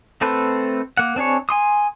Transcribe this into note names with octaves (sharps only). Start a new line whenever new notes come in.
A3 C4 A4 B4 C5
A#3 F#5
C4 D4 G#4 C#5
G#5 C6 D#6